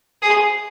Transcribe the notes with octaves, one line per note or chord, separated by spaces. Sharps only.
G#4